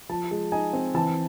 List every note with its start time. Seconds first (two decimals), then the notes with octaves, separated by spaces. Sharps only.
0.09 F3 A5
0.31 G#3
0.52 D#4 G#5
0.73 C4
0.94 E3 A5